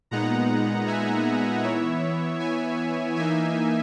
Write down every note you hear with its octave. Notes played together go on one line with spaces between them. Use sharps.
A#2 G#3 B3 D#4 F#5 A#5
E5 G#5
E3 B3 E4 C#5 E5
E5 G#5
E3 A#3 D#4 E5 G#5